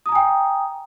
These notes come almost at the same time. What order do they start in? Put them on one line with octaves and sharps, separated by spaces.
D#6 A#5 G#5 G5